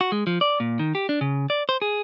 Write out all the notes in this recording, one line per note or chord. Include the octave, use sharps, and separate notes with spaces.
F#4
G#3
F3
D5
A#2
D#3
G4
D4
C#3
D5
C5
G#4